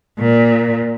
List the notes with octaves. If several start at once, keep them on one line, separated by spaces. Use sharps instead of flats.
A#2